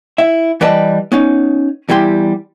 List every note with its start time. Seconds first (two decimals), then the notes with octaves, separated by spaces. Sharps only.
0.18 E4 E5
0.61 E3 G3 B4 D5 D#5 A5
1.12 B3 C#4 D#4
1.89 E2 G3 E4 G4 C6